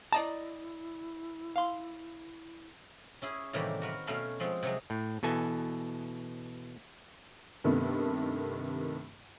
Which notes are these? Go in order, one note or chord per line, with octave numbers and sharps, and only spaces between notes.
E4 D5 D#5 A5 A#5
F5 C6
C#4 E4 G#4
A2 C3 D#3 E3 G3 A#3
F#4 A#4 B4
B2 A3 C#4 A#4 F5 B5
F3 G#3 C4
C3 F#3 G#3
A2
B2 E3 A4 G#5
G2 C3 D#3 A3 B3